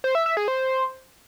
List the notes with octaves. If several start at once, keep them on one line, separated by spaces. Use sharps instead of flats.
C5
E5
E5
G#4
C5